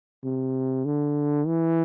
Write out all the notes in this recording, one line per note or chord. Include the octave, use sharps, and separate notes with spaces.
C3
D3
E3